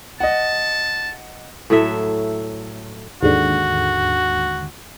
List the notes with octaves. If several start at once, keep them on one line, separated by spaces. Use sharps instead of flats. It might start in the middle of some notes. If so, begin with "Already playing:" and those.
D#5 F#5 A5
A2 F#3 A3 E5
D#2 G#2 D3 F#4